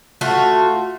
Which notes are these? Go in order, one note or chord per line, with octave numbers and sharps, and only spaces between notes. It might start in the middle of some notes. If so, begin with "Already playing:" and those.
A3 F4 F#4